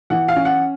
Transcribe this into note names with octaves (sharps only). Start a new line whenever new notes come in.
E3 F#5
F5
C#4
F#5